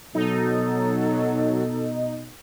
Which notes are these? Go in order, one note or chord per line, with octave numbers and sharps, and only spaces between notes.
B2 F#3 D#4 A4